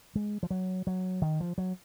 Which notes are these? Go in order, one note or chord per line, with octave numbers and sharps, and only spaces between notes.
G#3
F3
F#3
F#3
D#3
F3
F#3